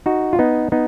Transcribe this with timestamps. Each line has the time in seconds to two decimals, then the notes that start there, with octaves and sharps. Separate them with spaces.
0.06 D#4 F#4
0.33 F4
0.39 B3 D#4
0.72 B3 D#4